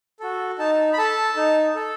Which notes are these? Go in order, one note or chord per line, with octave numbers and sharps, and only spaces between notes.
F#4 A4
D#4 A5
B5
A4 A5
D#4
A4